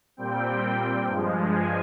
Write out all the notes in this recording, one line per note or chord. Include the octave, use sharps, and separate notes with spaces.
A#2 G3 C4 G5
G2 F3 G#3
G#5